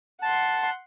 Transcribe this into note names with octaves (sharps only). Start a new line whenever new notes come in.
F#5 A5 C6